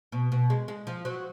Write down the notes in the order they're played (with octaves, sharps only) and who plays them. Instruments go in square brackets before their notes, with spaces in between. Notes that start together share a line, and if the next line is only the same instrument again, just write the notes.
[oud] B2
B2
G#3
G#3
F3
F#3